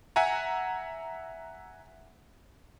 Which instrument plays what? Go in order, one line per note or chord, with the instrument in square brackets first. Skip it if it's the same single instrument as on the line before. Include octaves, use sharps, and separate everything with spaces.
[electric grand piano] E5 F#5 G#5 A#5